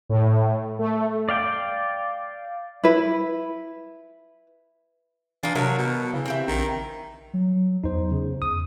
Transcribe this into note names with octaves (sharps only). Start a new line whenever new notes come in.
A2
A3
D5 F5 G5
E4 B4
E3 D4 D#4 F4
C3 F#3 A#4 A5
B2
C#3 E3
C4 G4 E5
A#1 D#3
F#3
E2 D#4 C5
C#3
E2 D#6